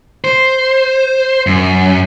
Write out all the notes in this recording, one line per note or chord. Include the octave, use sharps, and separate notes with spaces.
C5
F#2